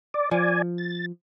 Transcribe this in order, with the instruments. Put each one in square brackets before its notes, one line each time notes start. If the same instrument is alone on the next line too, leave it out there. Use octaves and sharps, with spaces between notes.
[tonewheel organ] D5
[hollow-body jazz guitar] F3 [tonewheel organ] D5 G#5
[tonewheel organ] A6